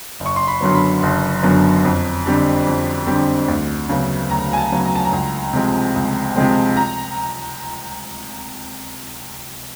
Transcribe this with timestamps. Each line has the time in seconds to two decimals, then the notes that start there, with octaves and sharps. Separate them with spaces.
0.20 F#1
0.26 C#6
0.36 C6
0.47 B5
0.61 F#2 D3 F#3 B3
0.75 B5
1.03 F#1
1.43 F#2 D3 F#3 B3
1.85 F2
2.26 D3 G3 C4
2.67 F2
3.07 D3 G3 C4
3.48 D2
3.89 C#3 F#3 B3
4.30 D2 A#5
4.53 G#5
4.57 A5
4.72 C#3 F#3 B3
4.86 A#5
4.95 A5
5.05 A#5
5.12 C#2
5.53 C3 F3 G#3 C4
5.95 C#2
6.36 C3 F3 G#3 C4
6.77 A#5